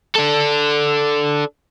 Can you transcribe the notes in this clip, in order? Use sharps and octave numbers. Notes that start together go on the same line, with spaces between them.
D4 A4